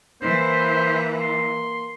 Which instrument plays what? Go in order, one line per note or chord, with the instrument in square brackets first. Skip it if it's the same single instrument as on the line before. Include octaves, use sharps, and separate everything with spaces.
[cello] E3 [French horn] A#3 [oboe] C5
[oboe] C6